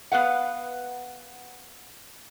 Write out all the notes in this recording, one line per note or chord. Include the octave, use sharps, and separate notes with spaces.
B3 B4 F5 F#5